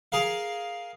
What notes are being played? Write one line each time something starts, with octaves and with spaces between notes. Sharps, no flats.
G#4 A#4 F5